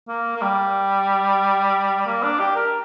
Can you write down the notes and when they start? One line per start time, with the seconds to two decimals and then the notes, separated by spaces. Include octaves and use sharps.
0.08 A#3
0.36 A#3
0.42 G3
2.07 A#3
2.23 D4
2.40 G4
2.56 A#4